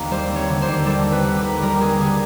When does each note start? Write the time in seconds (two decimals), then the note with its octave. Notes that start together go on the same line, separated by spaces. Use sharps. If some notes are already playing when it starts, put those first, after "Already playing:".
Already playing: D#2 D3 C4 F5
0.11 G3 C5
0.30 C4
0.36 C#5
0.49 D3
0.62 C5
0.67 D#2
0.86 G3 A4
1.05 C4
1.12 B4
1.25 D3
1.37 B4
1.43 D#2
1.62 G3 A#4
1.80 C4 G#4
2.00 D3 G#4